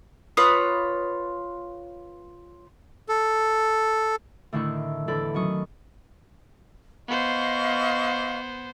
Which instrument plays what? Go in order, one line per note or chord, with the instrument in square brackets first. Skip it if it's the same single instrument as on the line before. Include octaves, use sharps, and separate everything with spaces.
[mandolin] F4 B4 C#5 D#6
[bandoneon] A4
[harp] A2 D3 D#3 E4 C#6 E6
E2 D3 A4 D5 B5
D#3 F#3 C#4 C#6 D#6
[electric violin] B3 C5 [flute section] D#5 F5 C#6